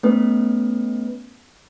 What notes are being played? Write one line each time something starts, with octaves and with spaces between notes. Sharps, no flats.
A3 B3 C#4 B4